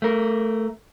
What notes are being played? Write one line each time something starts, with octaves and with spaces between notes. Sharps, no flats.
A3 A#4